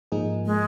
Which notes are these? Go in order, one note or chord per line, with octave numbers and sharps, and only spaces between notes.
G#2 F3 A#3 D#4 G#4
G#3